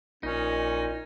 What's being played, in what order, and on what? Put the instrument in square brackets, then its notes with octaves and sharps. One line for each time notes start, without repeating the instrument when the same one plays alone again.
[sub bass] A#1 [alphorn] A#2 [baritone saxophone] C#4 [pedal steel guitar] D#4